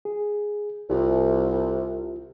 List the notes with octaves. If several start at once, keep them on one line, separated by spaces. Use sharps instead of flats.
G#4
C2 E4 F4 G4